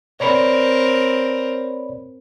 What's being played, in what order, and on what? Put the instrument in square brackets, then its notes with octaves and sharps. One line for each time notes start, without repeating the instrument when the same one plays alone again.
[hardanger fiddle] C4 A#4 [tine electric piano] C#5 D5 B5